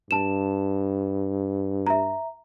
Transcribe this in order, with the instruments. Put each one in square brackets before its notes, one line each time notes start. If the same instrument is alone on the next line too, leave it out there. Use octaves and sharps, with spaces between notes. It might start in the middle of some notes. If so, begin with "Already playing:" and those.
[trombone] G2 [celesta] A5 E7
[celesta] E5 A#5